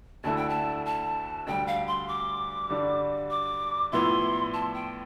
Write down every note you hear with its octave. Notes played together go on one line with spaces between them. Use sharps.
D2 D3 A3 E4 A5
G5
A5
A5
D2 D3 G3 G5
F5
C6
D6
G2 D3 G3 D4
D6
A2 F3 B3 E4 C6
A5
G5